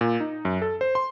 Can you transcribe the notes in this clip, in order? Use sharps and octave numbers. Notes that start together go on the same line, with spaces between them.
A#2
D#4
F#2
A4
C5
C6